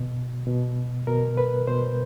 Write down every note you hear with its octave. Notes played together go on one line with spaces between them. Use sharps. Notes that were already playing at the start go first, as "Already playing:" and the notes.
Already playing: B2
B2
B2 A#4
B4
B2 C5